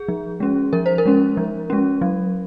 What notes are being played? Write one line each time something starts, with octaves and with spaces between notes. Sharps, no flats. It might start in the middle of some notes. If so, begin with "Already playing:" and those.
Already playing: G#4
F3
G#3 C#4
F3 A#4
C5
A#4
G#3 C#4
F3
G#3 C#4
F#3